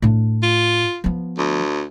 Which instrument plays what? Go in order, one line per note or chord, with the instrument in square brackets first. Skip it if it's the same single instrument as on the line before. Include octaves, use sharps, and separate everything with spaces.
[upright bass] A2 D4
[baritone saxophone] F4
[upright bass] F3 B3
[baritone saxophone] D2